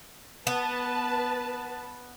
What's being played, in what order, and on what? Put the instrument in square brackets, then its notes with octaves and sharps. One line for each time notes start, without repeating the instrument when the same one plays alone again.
[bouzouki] B3 [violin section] B4 A5